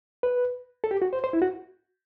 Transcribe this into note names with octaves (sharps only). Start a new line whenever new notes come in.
B4
A4
G4
F#4
C5
C5
E4
F#4